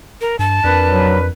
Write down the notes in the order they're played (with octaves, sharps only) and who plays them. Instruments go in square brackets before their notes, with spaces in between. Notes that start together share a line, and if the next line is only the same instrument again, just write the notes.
[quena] A#4
[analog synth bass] G2 [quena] A5
[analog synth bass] F2 [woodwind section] D4 A#4 B4
[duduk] F#3